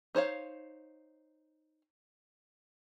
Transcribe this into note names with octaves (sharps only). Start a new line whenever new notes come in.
D#4 C5 C#5 F5